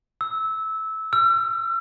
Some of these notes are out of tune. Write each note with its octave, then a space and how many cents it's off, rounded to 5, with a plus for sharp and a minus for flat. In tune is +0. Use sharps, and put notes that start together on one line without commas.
E6 -15
E6 +45